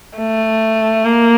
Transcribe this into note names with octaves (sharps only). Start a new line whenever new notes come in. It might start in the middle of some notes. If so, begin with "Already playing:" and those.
A3
A#3